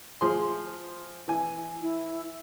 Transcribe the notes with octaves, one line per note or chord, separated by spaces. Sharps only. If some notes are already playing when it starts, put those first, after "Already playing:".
F3 G#4 C6
E3 G#5
E4